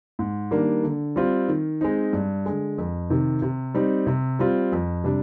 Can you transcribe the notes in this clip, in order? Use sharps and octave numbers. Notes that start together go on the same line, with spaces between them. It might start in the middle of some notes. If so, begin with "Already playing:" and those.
G#2
D#3 G3 A#3 D4
D3
G3 C4 F4
D#3
G#3 C4 D#4
G2
D3 G#3
F2
C3 D#3
C3
G3 C4 D#4
C3
G3 C4 F4
F2
C3 G3 D4